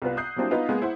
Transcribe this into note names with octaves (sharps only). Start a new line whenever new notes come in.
C2 B3 F4 B4
D#6 F#6 G6 C7
F#3 G3 A#3 C4 D4 E4
B3 D#4 F4 B4 D#5 F5
G#3 A#3 B3 G#4
E4 C5 F#5